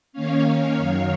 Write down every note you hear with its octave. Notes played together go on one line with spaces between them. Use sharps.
D#3 A#3 C#4 C#5 F5
F#2 D#3 F#3